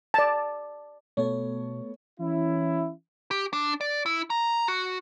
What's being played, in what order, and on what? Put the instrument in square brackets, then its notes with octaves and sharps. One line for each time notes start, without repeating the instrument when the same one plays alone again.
[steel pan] D5 A5
[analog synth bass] B2 [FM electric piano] A3 B3 A4 [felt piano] C#5
[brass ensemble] E3 C#4 E4
[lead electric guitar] G4
D4
D5
E4
A#5
F#4